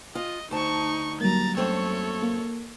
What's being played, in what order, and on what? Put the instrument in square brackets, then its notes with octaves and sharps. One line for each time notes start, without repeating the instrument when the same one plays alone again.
[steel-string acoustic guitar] F4 [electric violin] D#5
[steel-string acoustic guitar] D2 A5 [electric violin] D#4 C#6
[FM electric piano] F#3 G3 A#3 [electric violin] A#5 A6
[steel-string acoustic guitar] F#2 A3 C4 [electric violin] A4 C#5
[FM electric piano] A#3